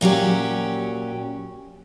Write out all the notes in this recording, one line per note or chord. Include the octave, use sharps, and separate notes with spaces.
A#2 F#3 C#4 G4